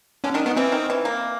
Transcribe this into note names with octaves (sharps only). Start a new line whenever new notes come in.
D3 C#4
D#3 D4
D#3 B3
E3 C4
D#3
E3
A#3